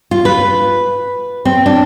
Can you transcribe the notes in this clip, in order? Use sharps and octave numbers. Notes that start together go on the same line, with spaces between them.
F4
B4
C4
D4